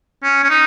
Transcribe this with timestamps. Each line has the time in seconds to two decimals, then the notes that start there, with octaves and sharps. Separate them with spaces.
0.23 C#4
0.44 C#4
0.50 D#4